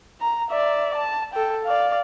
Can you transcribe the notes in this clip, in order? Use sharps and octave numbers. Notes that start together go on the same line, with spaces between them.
A#5
D5 E5
A5
A4 G5
D5 F5